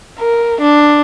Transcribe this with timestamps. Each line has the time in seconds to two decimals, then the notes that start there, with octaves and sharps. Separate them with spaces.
0.19 A#4
0.61 D4